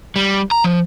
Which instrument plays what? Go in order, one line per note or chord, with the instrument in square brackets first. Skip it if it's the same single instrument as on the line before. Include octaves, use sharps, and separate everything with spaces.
[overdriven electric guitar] G3
A#5
F3